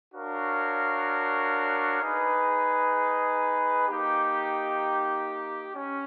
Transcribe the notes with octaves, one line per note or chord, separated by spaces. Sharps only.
D4 F#4 A#4 C#5 F5
D#4 G#4 B4
A#3 D#4 G4
C#4